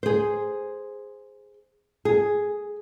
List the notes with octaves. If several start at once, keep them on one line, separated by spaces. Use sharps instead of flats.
G#4 C5
G#4